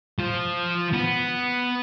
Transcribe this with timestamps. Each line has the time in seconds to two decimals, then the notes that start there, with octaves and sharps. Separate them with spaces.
0.19 F3
0.93 B3